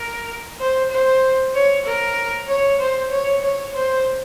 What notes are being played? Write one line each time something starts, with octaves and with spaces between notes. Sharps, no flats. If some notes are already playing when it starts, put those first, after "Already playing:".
Already playing: A#4
C5
C5
C#5
A#4
C#5
C5
C#5
C#5
C5